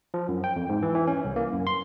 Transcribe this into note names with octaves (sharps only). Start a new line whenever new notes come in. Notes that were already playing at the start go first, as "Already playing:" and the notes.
F3
F#2
G5
F2
G#2
E3
E3
C#4
C2
A#3
F#2
C6